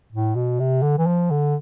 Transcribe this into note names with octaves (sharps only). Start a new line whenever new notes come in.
A2
B2
C3
D3
E3
F3
D3